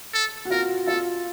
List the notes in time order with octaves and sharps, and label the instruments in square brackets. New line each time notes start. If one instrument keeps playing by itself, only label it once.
[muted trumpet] A4
[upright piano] F#4
[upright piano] F4 [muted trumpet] A#4
[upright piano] F4 [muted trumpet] A4